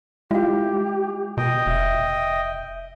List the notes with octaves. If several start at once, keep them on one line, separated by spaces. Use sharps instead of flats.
G#3 E4 F4 G4
B2 D#5 G5
F1 E5